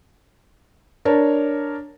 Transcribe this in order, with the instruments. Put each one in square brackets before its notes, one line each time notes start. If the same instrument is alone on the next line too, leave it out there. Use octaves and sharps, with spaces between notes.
[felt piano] D4 A#4 C#5 A5